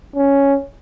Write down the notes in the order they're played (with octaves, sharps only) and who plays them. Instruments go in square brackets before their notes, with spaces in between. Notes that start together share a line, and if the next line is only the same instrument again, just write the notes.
[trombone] C#4